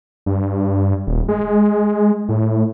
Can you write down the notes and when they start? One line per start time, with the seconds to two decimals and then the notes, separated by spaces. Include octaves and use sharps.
0.26 G2
1.07 D#1
1.28 G#3
2.29 A2